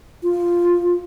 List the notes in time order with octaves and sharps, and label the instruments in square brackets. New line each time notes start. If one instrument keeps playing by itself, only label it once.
[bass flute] F4